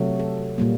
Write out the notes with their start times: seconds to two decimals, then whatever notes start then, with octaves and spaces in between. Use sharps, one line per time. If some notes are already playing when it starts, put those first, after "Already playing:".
Already playing: C3 F#3 A3
0.19 A4
0.58 A#2 G3 A#3